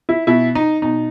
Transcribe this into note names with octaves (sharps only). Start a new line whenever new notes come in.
E4
B2 E4
D#4
B2 D#4